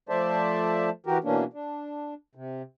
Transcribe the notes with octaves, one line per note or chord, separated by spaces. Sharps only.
F3 A3 C5 D5 E5 A5
E3 F#4 G4 A#4
B2 E3 A#3 C#4 D4
D4
C3